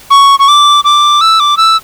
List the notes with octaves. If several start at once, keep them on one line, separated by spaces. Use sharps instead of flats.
C#6
C#6
D6
D6
E6
D6
E6